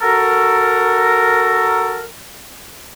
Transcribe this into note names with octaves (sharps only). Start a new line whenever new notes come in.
F#4 A4 A#4